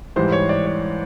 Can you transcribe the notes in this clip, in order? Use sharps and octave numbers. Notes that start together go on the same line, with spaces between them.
G#2 E3 G3 C5
C#5
D5
C#5